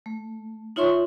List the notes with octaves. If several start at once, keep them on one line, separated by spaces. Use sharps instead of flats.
A3
D#4 F4 C#5 E5 C6 C#6